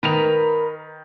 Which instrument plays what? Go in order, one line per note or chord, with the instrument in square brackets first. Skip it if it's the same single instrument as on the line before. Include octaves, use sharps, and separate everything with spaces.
[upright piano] D#3 F7 [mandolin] A#4 B4